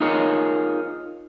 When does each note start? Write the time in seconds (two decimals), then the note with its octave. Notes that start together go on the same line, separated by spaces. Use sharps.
0.01 D#4 F4 G#4 A#4 C#5 D#5